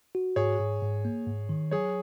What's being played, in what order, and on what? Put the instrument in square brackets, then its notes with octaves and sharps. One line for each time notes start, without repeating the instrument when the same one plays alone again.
[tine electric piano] F#4
[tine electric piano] G#2 [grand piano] G#4 C#5
[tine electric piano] G#2
G#2
A#3
G#2
D#3
[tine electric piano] F#3 [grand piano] G#4 C#5